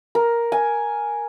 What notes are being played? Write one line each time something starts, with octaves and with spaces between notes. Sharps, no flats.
A#4
G#5